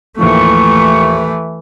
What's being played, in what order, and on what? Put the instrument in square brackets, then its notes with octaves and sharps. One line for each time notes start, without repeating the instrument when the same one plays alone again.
[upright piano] D#2 A2 F3 [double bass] E3 A3 [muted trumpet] C#6